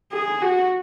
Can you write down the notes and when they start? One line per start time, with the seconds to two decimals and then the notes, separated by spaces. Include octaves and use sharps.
0.12 G#4
0.42 F#4